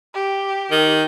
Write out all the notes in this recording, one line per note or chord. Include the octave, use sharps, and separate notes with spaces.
G4
D#3